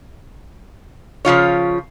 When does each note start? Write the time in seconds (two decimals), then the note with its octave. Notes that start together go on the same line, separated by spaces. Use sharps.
1.25 C#3 F3 F4 C#5